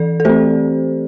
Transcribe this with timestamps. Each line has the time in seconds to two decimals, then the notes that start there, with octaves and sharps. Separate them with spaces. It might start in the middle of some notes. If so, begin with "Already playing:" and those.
Already playing: E3 A4 D5
0.20 A4
0.25 A3 C4 G4 C5